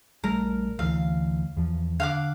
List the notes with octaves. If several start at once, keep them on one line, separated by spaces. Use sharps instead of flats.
A#1 G3 A3 A#4
D2 E3 F5
E2 F3
D3 F5 F#5 D6